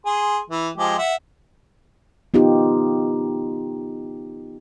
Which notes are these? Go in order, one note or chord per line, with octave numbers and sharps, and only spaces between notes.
G#4 C6
E3
F3 G#3 G4
E5 F#5
B3 D#4 F4 G4